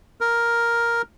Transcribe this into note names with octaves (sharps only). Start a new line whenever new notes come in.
A#4